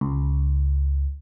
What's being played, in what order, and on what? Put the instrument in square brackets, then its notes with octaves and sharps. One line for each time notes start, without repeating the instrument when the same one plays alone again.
[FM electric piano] C#2